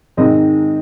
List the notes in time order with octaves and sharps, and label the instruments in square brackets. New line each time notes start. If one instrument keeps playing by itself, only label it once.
[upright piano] G#2 D#3 G#3 C4 D#5